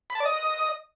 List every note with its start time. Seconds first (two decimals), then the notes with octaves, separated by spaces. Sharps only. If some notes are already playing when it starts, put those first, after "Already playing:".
0.10 B5
0.15 A5
0.20 D5
0.25 D#5